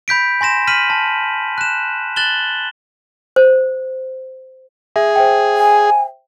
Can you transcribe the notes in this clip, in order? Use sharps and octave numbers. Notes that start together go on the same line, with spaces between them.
B5 G6 B6 D7
G#5 C6 A#6 E7
F6 B6 D#7 F#7
A5
F#6 E7
F#6 A6 E7 F#7 G7
C5
G#4 E5
C5 E5 G5
G#5